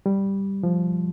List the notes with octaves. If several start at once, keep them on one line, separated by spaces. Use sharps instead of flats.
G3
F3